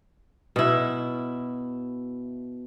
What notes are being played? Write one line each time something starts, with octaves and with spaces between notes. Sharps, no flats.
B2 E4